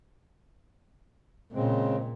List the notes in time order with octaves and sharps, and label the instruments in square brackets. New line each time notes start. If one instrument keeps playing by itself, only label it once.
[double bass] A#2 [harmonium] C#3 G#3 C4